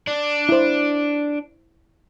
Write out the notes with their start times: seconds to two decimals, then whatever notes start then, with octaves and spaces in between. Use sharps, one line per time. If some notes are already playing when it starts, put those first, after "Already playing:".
0.07 D4
0.49 E4 C5